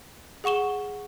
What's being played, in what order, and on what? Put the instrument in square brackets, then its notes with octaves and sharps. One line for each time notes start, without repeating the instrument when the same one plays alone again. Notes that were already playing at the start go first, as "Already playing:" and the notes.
[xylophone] G#4 F#5 C#6 E7 G7